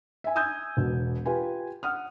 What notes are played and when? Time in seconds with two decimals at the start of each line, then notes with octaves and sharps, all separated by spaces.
0.24 E5 G#5
0.35 G#5 D#6 E6 G6 G#6
0.77 E1 B2
1.26 F4 G4 B4 G#5
1.83 F#5 D#6 F6